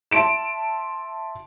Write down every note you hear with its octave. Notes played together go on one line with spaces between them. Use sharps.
E5 A5 C6 D7 E7